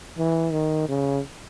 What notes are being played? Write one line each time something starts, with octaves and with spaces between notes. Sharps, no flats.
E3
D#3
C#3